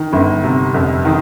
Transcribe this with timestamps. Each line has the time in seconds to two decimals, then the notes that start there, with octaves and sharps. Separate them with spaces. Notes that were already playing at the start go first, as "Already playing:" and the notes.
Already playing: D#3
0.13 G1
0.44 C3
0.74 F2
1.05 D#3